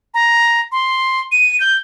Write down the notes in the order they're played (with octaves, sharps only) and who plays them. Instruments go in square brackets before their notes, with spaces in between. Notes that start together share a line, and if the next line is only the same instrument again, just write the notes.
[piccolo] A#5
C6
D#7
G6